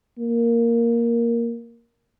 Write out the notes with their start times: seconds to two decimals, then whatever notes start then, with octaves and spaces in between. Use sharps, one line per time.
0.18 A#3